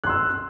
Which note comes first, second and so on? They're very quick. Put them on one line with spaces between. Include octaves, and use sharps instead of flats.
F#6 C6 E6